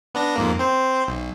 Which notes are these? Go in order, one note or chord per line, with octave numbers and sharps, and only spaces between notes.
B3 D4 A#6
F2 G#2 A#3
C4 C5
B1